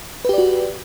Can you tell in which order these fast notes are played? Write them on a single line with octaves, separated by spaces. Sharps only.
B4 G4 D5 F#4